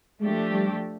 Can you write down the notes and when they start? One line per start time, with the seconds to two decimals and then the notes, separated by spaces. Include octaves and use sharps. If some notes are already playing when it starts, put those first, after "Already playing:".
0.20 F3 G#3 A3 D4 G4
0.51 G3